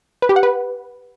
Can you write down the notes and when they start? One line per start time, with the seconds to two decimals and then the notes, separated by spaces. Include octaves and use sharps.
0.22 B4
0.29 G4
0.36 F#5
0.43 B4